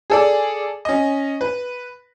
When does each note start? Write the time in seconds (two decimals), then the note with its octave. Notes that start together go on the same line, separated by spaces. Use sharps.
0.10 G#4 A4 D5
0.85 C#4 D#5
1.41 B4